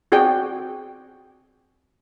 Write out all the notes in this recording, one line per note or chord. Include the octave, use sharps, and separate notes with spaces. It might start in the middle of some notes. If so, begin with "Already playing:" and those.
C4 F#4 G#4 D5 G5